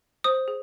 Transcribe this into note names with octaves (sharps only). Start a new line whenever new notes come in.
C5 D#6
G#4